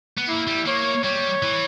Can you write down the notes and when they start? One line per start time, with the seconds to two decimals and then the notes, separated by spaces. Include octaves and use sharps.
0.17 B3
0.28 A#3 E4
0.47 G3
0.66 A#3 C#5
1.04 G3 C#5
1.43 E3